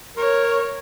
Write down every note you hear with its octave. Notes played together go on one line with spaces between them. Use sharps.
A#4 C#5